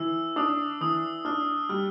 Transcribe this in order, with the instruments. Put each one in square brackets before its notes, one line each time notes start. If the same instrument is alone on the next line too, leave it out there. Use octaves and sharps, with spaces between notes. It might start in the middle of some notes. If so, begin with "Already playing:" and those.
Already playing: [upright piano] E3 [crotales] E6
[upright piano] D4 [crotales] D#6
[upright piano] E3 [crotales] D#6
[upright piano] D4 [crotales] F6
[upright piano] G3 [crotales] F6